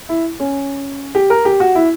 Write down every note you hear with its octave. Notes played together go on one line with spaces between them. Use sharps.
E4
C#4
G4
A#4
G4
F#4
E4